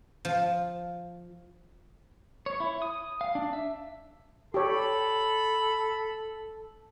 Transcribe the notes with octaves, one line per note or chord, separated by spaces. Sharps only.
F3
C#5
E4
D#6
F5
D4
E5
G4 A4 C#5 B5